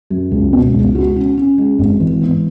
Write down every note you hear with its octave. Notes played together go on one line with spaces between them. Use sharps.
F#2
C#2
B2
C#2
F#4
C#4
C#4
G#3
G#1
E3
B3